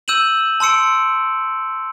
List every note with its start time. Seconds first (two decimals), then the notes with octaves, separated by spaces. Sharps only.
0.08 E6 G6 D#7 E7 F#7
0.60 A5 C6 E6 C#7 D7